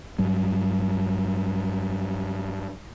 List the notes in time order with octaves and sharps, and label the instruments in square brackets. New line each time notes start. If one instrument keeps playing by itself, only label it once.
[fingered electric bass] G2 F#3 G3